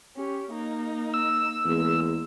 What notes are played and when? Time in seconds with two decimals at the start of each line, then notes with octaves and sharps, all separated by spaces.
0.16 C#4 G4
0.51 A#3 D#4
1.14 E6
1.65 E2 G#3 A#3